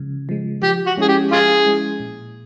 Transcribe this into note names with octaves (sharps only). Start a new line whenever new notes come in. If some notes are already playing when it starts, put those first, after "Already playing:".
Already playing: C#3 F3 G#3
F3 G#3
F3 G4
F#4
G#3 C#4 E4 G#4
G4
F3 F4 G#4
G#3 C#4 E4
A#2